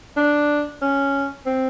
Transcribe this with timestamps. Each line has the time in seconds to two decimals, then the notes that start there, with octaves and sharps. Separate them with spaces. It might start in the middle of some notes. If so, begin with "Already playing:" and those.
0.17 D4
0.81 C#4
1.46 C4